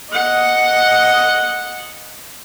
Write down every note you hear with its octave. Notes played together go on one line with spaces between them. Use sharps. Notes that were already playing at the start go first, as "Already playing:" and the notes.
D#5 F#5